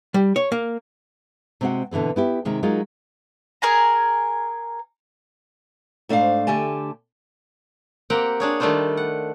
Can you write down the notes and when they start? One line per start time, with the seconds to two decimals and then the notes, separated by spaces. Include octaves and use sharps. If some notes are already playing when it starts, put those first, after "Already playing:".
0.14 G3
0.36 C#5
0.52 A#3
1.61 C3 G#3 C4 D4 F#4 F#5
1.91 B2 D3 E3 G#3 C4
2.16 B3 E4 G4
2.45 C3 D#3 G#3
2.63 F#3 G#3 D#4 F4 A#4
3.62 G#4 A#4 G#5 A#5
6.09 G#2 A3 D4 C5 F5
6.47 D3 A3 G4 G#5 A5
8.10 A#3 C4 G4 F#5 G5 A#5
8.40 D4 G#4 C#5
8.60 D#3 G3 A3 D4 F4 C5
8.97 F#5